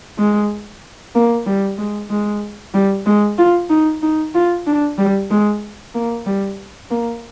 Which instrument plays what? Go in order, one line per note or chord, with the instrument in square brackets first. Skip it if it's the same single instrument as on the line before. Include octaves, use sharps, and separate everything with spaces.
[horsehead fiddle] G#3
A#3
G3
G#3
G#3
G3
G#3
F4
D#4
D#4
F4
D4
G3
G#3
A#3
G3
A#3